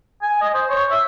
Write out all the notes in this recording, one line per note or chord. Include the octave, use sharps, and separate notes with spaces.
G#5
D#5
C5
C#5
E5